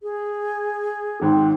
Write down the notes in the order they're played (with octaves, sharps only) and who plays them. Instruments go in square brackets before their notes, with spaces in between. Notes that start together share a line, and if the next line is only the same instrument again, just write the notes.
[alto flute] G#4
[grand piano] G#1 G#2 [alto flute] C4